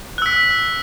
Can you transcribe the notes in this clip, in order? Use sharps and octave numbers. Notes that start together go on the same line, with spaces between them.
E6 F#6 B6